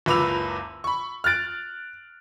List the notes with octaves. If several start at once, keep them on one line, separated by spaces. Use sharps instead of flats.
F#1 C#2 B4 D6 E6 F7
B5 C#6
F6 F#6 A6 D7